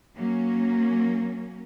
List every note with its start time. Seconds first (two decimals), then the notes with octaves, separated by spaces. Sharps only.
0.16 F#3 A#3 C#4